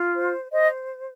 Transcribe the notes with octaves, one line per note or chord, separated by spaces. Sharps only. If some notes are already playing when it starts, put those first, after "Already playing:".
Already playing: F4
C5
C5 D#5